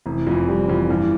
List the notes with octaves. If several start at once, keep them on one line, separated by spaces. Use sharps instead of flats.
F1 E3
F2 E3 F3
F1 G3
F2 E3 F3
G2 E3